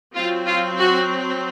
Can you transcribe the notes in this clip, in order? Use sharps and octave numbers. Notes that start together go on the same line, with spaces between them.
F#3 C4 F4
F4
F#4